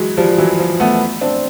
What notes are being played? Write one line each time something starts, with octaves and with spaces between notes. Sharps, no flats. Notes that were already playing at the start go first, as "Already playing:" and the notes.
Already playing: E3 F#3 G#3
F3 G3
E3 F#3
F3
A3 B3
C4 D4